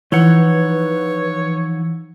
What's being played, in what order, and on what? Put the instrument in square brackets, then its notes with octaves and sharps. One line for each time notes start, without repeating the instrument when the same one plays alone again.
[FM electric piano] E3 [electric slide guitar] F3 D#4 F#5 [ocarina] B4 [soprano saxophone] C#5